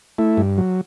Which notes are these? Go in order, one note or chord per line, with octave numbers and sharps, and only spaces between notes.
A3 E4
G2
F#3